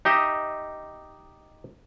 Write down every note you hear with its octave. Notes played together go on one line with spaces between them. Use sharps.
D#4 G4 D#5 E5